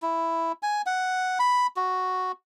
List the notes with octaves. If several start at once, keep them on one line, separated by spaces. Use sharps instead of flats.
E4
G#5
F#5
B5
F#4